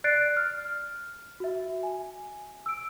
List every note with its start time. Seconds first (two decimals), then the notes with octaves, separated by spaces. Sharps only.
0.04 D5 F#6 A6 C7 D7
0.37 F6
1.40 F#4 E5
1.83 G#5
2.66 E6 D7